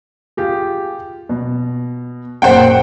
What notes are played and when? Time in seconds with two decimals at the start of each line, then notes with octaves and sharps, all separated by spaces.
0.37 F4 G4 G#4
1.29 B2
2.42 F#1 A#2 C5 F#5 G5